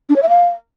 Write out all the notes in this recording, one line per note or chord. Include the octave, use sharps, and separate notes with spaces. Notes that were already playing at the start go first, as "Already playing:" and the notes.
D4
C#5
E5
F5